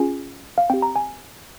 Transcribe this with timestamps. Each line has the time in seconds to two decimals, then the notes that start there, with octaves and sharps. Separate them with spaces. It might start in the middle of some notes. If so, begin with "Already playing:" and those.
Already playing: C#4 F4 G#4 G#5
0.58 F5
0.70 C4 G4 G5
0.82 A#5
0.96 G#5